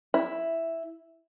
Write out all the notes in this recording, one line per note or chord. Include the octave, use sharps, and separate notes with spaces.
E4